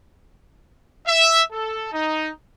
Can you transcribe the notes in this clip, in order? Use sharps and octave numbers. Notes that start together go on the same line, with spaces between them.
E5
A4
D#4